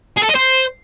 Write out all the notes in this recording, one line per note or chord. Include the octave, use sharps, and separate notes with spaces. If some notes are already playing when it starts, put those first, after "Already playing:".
G#4
A4
D#5
C5